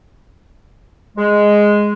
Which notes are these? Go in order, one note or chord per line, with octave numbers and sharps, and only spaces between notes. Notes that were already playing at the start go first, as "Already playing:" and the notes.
G#3